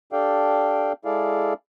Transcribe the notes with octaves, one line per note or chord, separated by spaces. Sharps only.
D4 G4 A4 D5 F5 G5
G#3 E4 G#4 A4 D5 F5